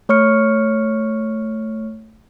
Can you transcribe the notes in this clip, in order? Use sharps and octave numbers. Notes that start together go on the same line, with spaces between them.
A3 C#5 C#6 F6 C#7